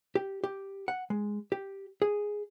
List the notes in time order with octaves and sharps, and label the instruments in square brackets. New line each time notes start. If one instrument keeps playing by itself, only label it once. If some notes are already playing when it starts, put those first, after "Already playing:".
[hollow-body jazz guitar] G4
G4
F#5
G#3
G4
G#4